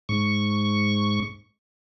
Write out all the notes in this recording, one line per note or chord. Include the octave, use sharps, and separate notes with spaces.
G#2 C#6